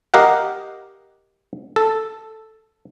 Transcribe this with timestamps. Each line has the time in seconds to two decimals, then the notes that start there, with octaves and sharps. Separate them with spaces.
0.14 G4 A#4 D#5 F5 F#5
1.76 A4